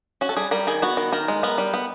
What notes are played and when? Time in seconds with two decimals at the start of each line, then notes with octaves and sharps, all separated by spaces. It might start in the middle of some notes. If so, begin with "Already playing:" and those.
0.21 C#4 F#4
0.29 A4
0.37 G3 G#4
0.51 G3 A#4
0.67 D#3 G#4
0.82 B3 F#4
0.97 D#3
1.12 D#3 A#4
1.28 G#3
1.43 B3 A#4
1.58 G3
1.74 B3